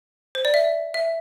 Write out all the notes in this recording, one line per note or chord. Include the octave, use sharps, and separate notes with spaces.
C5
D5
E5
E5